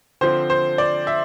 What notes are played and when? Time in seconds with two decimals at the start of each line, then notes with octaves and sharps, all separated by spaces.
0.21 D3 F3 C4 C5
0.50 C5
0.78 D5
1.07 E5